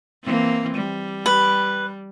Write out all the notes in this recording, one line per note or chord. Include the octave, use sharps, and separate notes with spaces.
E3 A#3 C4
G3
B4